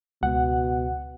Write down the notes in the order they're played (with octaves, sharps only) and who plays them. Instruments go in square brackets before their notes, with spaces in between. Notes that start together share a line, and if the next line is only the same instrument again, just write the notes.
[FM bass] C#2 [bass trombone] B2 [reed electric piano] F#5